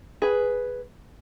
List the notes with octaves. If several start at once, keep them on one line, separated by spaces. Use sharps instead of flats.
G#4 B4